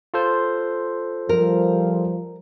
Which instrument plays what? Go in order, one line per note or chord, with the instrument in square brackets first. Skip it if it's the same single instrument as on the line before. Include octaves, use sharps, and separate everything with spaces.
[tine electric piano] F4 A4 C5
[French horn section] F3 G3 [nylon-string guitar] A#4